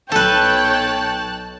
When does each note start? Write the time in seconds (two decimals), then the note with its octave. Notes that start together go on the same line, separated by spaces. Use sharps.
0.12 B1 A4 B4 C#5 G5 A5 F#6